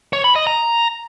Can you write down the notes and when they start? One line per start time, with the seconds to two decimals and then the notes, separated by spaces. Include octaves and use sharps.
0.13 C#5
0.24 B5
0.35 D#5
0.47 A#5